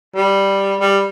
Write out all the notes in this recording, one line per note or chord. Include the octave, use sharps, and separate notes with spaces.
G3
G3